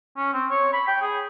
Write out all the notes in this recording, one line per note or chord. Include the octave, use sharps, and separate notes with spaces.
C#4
C4
C#5
B5
G5
G#4